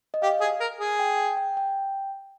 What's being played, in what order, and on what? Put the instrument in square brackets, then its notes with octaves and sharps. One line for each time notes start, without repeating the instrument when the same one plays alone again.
[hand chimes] D#5
[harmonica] G4 [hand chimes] F5
[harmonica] G#4
A#4
G#4
[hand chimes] G5
G5
G5
G5